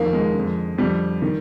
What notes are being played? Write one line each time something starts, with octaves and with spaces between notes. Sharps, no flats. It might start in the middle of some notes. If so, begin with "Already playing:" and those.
Already playing: F2 D#3 A#3
G#3
F2 D3
F2 D3 G3
D#3